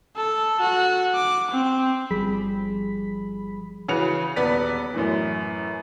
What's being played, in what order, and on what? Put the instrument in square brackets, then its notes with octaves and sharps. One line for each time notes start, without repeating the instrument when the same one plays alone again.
[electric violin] A4
F#4
D6
C4
[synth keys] G1 F3 G3 G#4 B5 B6
[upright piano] C#3 E3 F#4 B4 C#7 F7
D#1 B3 B4 D5 B6
F#2 A2 E3